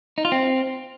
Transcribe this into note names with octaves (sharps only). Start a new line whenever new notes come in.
D#4
F4
C4